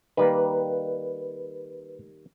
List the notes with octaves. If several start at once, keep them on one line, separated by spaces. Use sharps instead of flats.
D#3 G3 A#3 B4